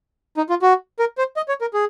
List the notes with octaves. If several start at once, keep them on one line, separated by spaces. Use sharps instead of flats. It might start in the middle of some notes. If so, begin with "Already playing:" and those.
D#4
F4
F#4
A#4
C5
D#5
C#5
A#4
G#4